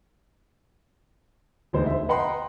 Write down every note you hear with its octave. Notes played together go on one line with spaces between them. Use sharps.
E1 D2 D#4 C5
E5
B4 D#5 F#5 G5 A#5 C6